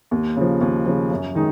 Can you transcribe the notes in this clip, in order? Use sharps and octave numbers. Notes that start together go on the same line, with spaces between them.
D#2
C#3 F3
D#2
C#3 F3
F#2
D#3 G#3 D#4